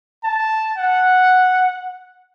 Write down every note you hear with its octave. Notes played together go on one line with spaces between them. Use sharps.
A5
F#5